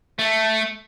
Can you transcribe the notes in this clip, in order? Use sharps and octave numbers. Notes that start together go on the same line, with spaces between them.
A3